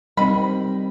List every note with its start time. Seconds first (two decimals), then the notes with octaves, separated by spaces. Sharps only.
0.17 D#3 G3 C4 B5